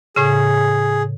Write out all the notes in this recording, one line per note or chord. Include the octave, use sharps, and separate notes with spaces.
A2 C#3 G#4